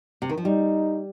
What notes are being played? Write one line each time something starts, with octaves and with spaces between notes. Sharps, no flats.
C3
D#3
F3
G3 D#4